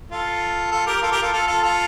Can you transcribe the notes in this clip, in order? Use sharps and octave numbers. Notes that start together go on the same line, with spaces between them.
F4 A4
F4 A4
G4 A#4
F4 A4
G4 A#4
F4 A4
F4 A4
F4 A4
F4 A4